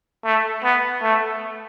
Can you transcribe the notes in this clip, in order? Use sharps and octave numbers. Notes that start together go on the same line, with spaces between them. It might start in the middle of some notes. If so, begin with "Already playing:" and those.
A3
B3
A3